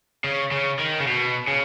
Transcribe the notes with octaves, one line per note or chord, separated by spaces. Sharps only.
C#3
C#3
D#3
C#3
B2
C#3